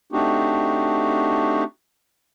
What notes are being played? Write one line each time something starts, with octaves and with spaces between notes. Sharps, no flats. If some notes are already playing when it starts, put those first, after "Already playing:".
A3 C4 D4 D#4 F#4 G4